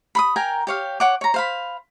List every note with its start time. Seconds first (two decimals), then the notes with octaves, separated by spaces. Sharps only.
0.15 B5 C6 D#6
0.36 A#4 G5 G#5 A#5
0.67 G4 C#5 F5
1.00 C#5 F#5 D6
1.21 C#5 A#5
1.34 C5 F5 B5